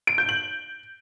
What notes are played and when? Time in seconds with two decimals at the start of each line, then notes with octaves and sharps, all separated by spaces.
0.07 D7
0.18 G6
0.29 F#7